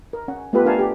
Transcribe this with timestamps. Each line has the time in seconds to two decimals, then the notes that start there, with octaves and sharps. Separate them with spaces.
0.13 A#4
0.28 C#4 F#5
0.53 A3 B3 F4 G4 A4 B4
0.65 D4 A#4 F5 G#5 A5
0.79 G4